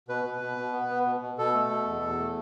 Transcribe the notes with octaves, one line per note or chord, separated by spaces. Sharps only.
B2 B4
B2
B2
B2
B3
B3
B2
B2
B2 A4
A3
B2
E2
E2
A3